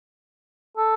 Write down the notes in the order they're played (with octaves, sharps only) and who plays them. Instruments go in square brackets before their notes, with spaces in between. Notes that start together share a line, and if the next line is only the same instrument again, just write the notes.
[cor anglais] A4